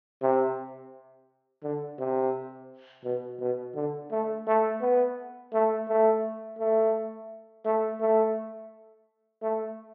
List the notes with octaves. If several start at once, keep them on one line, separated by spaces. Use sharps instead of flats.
C3
D3
C3
B2
B2
D3
A3
A3
B3
A3
A3
A3
A3
A3
A3